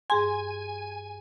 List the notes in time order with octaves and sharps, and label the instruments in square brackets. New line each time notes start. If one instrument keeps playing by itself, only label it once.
[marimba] G2 G#4 C6 [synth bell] G#5